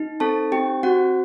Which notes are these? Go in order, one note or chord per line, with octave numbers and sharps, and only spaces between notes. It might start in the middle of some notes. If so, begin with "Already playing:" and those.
Already playing: D#4
C4 A4 A5
C4 G4 G5
C4 F#4 F#5